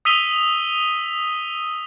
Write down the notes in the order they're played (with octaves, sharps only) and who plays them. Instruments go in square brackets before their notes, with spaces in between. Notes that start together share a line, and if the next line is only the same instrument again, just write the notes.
[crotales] D#6 E6 B6 D#7 F7 G7